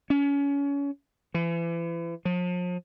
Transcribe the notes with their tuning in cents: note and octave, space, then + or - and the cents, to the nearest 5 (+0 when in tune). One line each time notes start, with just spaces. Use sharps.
C#4 +30
E3 +35
F3 +40